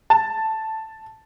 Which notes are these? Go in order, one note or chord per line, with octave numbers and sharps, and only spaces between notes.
A5